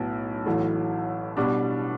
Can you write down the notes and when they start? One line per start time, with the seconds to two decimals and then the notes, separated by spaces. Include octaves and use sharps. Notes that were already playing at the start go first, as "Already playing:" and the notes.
Already playing: B1 A2 F#3 B3
0.45 A1 A2 F#3 A3
1.37 B2 G3 D4